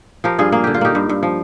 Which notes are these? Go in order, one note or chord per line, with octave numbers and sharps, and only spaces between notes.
F3 G4 A#4
G2 F4 G#4
A#3 G#4
D3 G4
F4
A#3 D#4 G4
G2
G2
F3